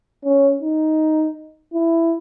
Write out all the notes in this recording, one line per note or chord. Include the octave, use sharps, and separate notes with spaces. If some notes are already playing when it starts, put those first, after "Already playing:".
C#4
D#4
E4